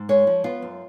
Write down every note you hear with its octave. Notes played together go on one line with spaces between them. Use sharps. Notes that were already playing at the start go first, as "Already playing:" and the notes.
Already playing: G#2
G#3 C#5
F3
B3 F4
F#2